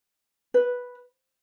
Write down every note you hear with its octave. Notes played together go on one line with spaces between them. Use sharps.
B4